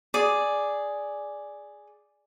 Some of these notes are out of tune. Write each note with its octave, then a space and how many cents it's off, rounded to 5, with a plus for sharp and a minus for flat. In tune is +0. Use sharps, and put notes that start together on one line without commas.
G#4 +0 D5 +0